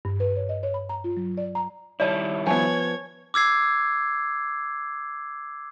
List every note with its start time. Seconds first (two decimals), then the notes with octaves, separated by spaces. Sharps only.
0.05 G2
0.20 B4
0.36 C#5
0.49 D#5
0.63 C#5
0.74 B5
0.89 A#5
1.04 F4
1.17 F#3
1.38 D5
1.55 A#5
2.00 D#3 G3 E4 C#5 D5 A5
2.47 F3 B3 C#5 G#5 G#6
3.34 D6 E6 G#6 C7